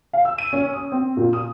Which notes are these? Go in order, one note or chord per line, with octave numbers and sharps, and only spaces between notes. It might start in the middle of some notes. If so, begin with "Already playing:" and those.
F5
E6
D#7
C#4
D#6
C4
A#2
D#6